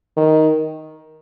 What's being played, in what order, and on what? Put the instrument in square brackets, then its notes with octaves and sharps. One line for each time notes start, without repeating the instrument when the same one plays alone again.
[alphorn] D#3